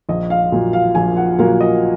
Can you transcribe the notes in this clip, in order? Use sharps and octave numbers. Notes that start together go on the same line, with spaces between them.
A#1 D#5
F5
A#2 F#3 A#3
F5
A#1 G#5
F#5
A#2 F#3 A#3 F5
D#5